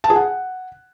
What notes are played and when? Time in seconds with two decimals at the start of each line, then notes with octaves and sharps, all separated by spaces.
0.04 A5
0.10 G#4
0.16 F#5